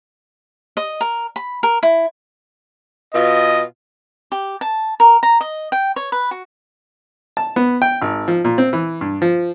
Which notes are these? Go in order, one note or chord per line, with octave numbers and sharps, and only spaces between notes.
D#5
A#4
B5
A#4
E4
B2 F4 D#5
G4
A5
A#4
A#5
D#5
G5
C#5
B4
F#4
A5
B3
G5
G#1
F3
A#2
C4
E3
G2
F3